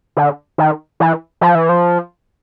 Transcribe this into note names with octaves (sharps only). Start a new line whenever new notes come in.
D3
D#3
E3
F3
E3
F3